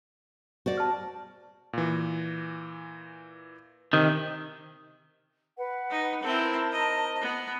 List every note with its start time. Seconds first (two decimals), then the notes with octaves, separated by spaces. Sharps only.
0.66 F#4 C5 D5
0.77 A5 F6
1.73 A#2 E3
3.93 C3 D#3
5.57 B4 F#5
5.91 D#4
6.23 C4 E4 A#4 C5 A5
6.72 D#5
7.21 B3